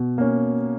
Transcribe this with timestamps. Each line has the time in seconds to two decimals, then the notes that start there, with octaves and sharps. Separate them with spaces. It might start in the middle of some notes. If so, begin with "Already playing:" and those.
Already playing: B2
0.18 A#3 C#4